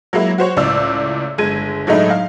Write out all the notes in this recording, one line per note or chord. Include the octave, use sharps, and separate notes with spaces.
F#3 G#3 A#3 E4
F#4 C5 C#5
C#2 A2 D5 E6
G1 G#3 G#6 D#7
A2 F#3 G#3 A3 D#4 E4
F5